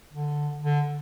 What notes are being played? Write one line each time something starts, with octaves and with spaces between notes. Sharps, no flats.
D3
D3